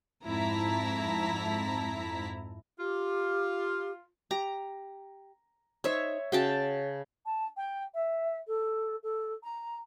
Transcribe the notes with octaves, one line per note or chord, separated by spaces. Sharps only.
F2 G#2 E4 A5 A#5 B6
F4 G4
G4 A#5
D#4 C5 C#5 E5
C#3 F#4 G5 A5
A5
G5
E5
A4
A4
A#5